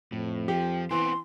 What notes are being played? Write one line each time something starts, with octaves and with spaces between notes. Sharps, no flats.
F2 A2
F3 G4 G5
E3 B3 C4 C6